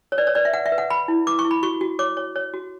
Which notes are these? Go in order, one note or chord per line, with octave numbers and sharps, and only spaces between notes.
C#5
B4 D5
C#5
B4 D5
E5
B4 F#5
E5
B4
F#5
B4 B5
E4
B4 D6
C#6
E4
B5
F#4 C#6
F#4
C#5 D6
C#5
C#5
F#4